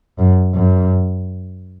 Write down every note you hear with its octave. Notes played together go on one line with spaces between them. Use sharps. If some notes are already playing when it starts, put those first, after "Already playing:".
F#2
F#2